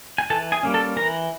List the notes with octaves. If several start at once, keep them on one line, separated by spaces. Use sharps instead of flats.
G#5
E3 A4 A5
G#4 G#5
G3 A#3 C#4
A4 A5
E3 A#4 A#5